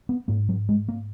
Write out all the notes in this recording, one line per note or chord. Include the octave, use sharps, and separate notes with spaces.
B3
G#2 A#3
F#3
G#3
A#3